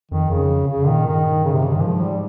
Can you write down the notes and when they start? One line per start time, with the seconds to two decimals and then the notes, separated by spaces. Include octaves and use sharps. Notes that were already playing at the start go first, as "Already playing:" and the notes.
0.11 F2 D#3
0.30 F2 C#3
0.68 C#3
0.87 A#2 D#3
1.06 G2 D#3
1.44 C#3
1.54 C3
1.63 C#3
1.72 G2 D#3
1.82 G#2 F3
2.02 G3